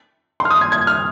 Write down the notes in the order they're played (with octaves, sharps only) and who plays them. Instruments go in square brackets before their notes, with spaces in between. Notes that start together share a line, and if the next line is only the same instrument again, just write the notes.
[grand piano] C6
F6
D#6
G#6
G#6
F6